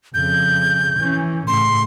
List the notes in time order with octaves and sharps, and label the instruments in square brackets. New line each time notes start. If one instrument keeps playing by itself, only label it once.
[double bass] F2 C#3 [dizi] G6
[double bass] E3 C#4
[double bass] A2 C#3 [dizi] C6